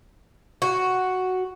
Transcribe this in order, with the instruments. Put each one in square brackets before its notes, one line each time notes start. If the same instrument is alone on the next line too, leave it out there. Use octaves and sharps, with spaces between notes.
[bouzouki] F#4